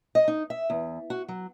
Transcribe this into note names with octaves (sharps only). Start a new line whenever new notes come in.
D#5
D#4
E5
E2
F#4
F#3